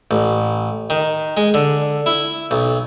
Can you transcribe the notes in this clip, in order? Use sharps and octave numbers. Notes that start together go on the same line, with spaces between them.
A1
D#3
G#3
D3
E4
B1